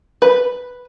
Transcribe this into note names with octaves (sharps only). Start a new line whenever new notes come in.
B4